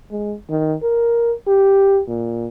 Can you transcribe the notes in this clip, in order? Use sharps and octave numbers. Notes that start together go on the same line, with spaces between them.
G#3
D#3
A#4
G4
A#2